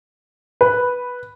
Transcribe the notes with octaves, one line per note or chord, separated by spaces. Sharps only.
B4